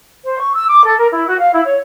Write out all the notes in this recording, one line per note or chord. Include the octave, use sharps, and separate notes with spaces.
C5
C#6
E6
D6
A4
A#4
E4
F#4
F5
E4
C#5